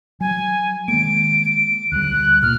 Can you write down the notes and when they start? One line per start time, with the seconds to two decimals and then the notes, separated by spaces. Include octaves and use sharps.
0.21 F#3 G#5
0.88 D#3 G#3 A#3 D7
1.45 D7
1.92 D2 G3 F#6
2.42 A#2 A#3 F6